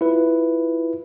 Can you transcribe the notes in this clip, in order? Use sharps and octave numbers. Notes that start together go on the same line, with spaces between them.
E4 F4 B4